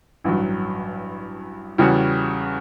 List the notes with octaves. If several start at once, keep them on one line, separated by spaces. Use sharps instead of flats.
A1 G2 F#3
E2 C#3 G3 C#4 F#4